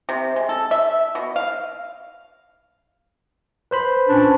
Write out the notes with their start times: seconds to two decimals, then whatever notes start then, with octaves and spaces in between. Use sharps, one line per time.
0.09 C3
0.36 G#3
0.49 A4
0.71 E5
1.15 B2
1.36 F5
3.71 B4 C5 B5
4.08 A#2 C#4 D4